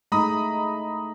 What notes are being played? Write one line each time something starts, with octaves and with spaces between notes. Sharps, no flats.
G#3 A3 D#4 A#5 B5 D#6